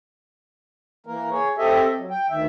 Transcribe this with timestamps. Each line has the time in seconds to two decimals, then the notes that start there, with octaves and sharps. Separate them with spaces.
1.07 E3 A#3 A#4
1.31 G#4 C#5
1.58 C4 G4 A4 D#5 E5
1.97 F#3
2.10 G5
2.30 D2 D#3 E5